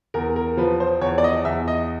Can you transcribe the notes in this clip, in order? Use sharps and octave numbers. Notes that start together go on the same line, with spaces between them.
E2 A#4
A#4
F3 B4
C5
E2 C#5
D5
D#5
E2 E5
D#5